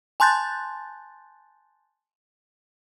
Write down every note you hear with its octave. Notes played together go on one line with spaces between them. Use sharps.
G#5 A5 C6 F#6 G6 A6